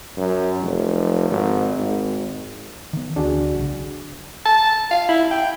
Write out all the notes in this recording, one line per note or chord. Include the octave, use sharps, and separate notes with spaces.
F#2
F1
G#1
G#1
D#3 B3
D2 D4 F#4 G#4
B1 C#3
A5
F5
E4
G5